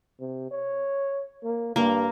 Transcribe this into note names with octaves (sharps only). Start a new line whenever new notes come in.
C3
C#5
A#3
G2 A#3 A#4